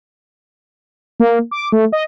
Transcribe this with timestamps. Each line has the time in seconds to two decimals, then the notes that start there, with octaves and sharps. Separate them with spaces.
1.20 A#3
1.51 D6
1.72 A3
1.92 D#5